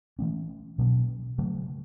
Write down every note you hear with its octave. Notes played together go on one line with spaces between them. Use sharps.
E3 A3 C#4
B2 F#3 A#3 C#4
C#3 F#3 A3